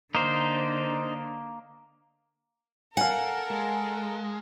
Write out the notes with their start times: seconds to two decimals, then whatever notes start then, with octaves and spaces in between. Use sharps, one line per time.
0.15 D3 A#3 D#4 C5
2.97 A4 A#4 F5 F#5 G#5
3.51 G#3